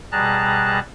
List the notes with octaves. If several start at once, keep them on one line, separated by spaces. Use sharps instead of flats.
B2 G3 G#4 A5 A#5 F#6